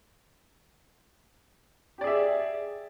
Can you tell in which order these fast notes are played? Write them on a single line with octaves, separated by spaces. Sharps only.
G4 D5 G#4 E5